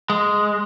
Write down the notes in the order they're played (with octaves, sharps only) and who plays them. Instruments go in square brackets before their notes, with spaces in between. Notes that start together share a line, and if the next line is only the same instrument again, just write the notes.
[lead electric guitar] G#3